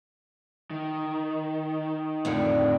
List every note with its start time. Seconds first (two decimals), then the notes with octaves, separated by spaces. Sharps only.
0.70 D#3
2.25 F2 A2 D3